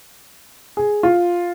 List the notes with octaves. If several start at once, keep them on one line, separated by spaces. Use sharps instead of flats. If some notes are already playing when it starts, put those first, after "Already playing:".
G#4
F4